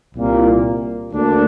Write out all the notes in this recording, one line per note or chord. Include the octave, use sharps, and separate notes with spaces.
C2 A#2 A#3
D2 D3 A#3 D4